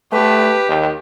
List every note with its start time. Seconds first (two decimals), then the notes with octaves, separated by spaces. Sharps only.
0.12 A3 G4 B4
0.68 D#2